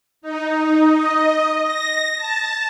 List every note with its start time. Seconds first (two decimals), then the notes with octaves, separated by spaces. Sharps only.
0.22 D#4
0.91 D#5
1.63 A#6
2.15 A5